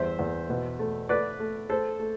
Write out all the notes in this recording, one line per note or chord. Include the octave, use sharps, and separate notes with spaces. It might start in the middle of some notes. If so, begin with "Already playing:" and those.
Already playing: E2 G3 C5 E5
E2
B2
A3
A3 B4 D5
A3
A3 A4 C5
A3